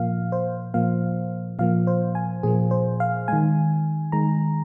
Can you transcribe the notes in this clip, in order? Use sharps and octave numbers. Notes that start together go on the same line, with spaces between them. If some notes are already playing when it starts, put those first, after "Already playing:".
Already playing: A#2 F3 A#3 F5
C5
A#2 F3 A#3 F5
A#2 F3 A#3 F5
C5
G#5
A#2 F3 A#3 G#4
C5
F5
D#3 G#3 G#5
D#3 G#3 A#5